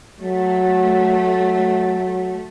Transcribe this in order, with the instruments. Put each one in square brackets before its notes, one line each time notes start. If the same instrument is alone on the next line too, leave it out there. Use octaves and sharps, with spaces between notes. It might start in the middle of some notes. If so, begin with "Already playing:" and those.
[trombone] F#3 [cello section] A3